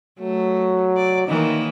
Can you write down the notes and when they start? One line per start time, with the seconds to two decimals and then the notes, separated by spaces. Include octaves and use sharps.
0.19 F#3 A3
0.97 D5
1.28 D#3 E3 A#3 D#4